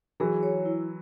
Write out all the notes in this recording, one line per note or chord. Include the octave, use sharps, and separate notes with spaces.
E3 F#3 G#4
C#5
E4